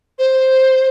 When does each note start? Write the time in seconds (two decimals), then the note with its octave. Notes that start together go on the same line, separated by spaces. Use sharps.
0.19 C5